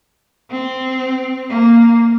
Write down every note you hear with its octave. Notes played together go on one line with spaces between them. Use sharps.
C4
A#3